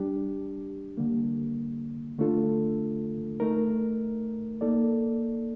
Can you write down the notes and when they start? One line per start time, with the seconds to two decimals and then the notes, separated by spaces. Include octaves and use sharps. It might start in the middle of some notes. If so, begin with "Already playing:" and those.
Already playing: G3 D4 G4
0.97 D3 G3 A#3
2.19 D3 A3 D4 F4 A4
3.40 A3 D#4 A#4
4.61 A#3 D#4 A4 D5